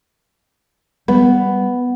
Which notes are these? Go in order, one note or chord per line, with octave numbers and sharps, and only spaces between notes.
G3 B3